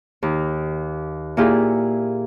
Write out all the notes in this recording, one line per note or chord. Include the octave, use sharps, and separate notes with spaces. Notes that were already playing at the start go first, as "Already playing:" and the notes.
D#2
A#2 E4 F4 G4 G#4